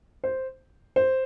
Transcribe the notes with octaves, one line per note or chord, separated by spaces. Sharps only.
C5
C5